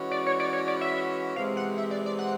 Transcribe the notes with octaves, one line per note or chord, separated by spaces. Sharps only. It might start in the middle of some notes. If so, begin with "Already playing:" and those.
Already playing: E3 G#3 C#4 F#4
D5
C#5
D5
C#5
D5
E5
C3 E3 G#3 C4 F5
F#5
E5
D5
D5
F#5